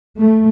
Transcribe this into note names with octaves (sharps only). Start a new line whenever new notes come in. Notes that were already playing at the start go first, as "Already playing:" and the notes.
A3